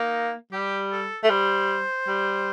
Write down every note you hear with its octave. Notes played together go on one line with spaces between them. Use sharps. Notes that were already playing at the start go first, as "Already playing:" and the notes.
Already playing: A#3 D#4
G3 G4
A4
A3
G3 C5
G3